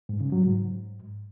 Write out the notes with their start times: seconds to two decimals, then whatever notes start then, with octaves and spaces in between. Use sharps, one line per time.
0.09 G#2
0.21 C#3
0.32 F#3
0.44 G#2